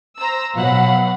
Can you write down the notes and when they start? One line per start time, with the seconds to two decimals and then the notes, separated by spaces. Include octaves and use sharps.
0.17 C5 A#5 E6
0.56 B2 F#3 F5 F#5 B5